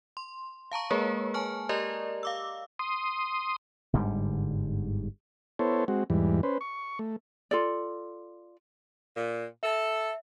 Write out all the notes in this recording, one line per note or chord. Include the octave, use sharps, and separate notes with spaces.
C6
F5 A5 A#5 C#6
G#3 A#3 G#4 A#4 B4 C#5
G#5 A5 C#6 F6
G4 A#4 D5 D#5 A#5
F5 D6 E6
C6 D#6
G1 G#2 D3 G3
B3 E4 A4 C5 C#5
G#3 C4 F#4
E2 G#2 E3 G3
C#4 B4 C5
C#6
A3
F4 A4 D5
A#2
A4 E5